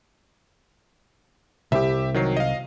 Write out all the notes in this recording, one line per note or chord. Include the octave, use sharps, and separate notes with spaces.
C2 G4 E5
D#3 F#3 C7
D#5 F5